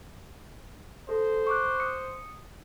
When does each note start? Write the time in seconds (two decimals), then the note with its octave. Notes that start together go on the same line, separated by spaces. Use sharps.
1.09 A4 C5
1.47 C#6 D6 F#6
1.80 D#6 C#7